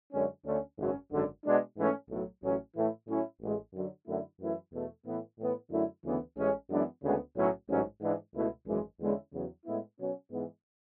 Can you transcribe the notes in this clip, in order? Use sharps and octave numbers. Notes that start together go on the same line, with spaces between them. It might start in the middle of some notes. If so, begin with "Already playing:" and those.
F#2 D3 G#3 C#4
D2 D3 A3 C#4
G#1 F#2 C#3 F#3 C#4
G#1 F#2 D3
B2 G#3 D4
G#2 E3 A3 C#4
B1 A2 F#3
A1 A2 F#3 C#4
A2 E3 A3 E4
A2 F#3 C#4 E4
A1 A2 G#3
F#2 D3 F#3
F#2 D3 A3 E4
F#2 E3 A3 E4
E2 B2 A3
A2 E3 B3 E4
A2 E3 B3
F#2 D3 A3 E4
D2 C#3 E3 B3
A1 A2 G#3 C#4
F#2 E3 G#3 B3 D4
D2 C#3 G#3 B3
B1 A2 F#3 C#4
A1 G#2 F#3 C#4
G#2 E3 G#3 D4
C#2 B2 A3 E4
G#1 F#2 E3 G#3
E2 D3 G#3 C#4 E4
E2 C#3 F#3
A2 G#3 B3 E4
B2 F#3 C#4
G#2 E3 G#3 B3